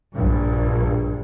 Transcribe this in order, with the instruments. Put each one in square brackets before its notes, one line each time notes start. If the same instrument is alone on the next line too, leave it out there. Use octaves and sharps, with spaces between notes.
[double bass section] A#1 G2